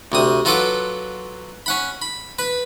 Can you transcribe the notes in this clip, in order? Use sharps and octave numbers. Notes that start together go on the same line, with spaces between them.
D2 C3 D#6
F#3 F4 A4 B4 F#5 D6
C#4 F#5 B5
B5
B4 B5